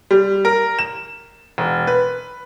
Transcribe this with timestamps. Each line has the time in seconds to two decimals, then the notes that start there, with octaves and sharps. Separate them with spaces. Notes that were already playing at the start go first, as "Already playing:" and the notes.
0.11 G3
0.45 A#4
0.79 E7
1.58 E1
1.87 B4